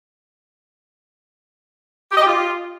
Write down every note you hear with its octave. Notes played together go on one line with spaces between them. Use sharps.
G4
D#5
G4
F4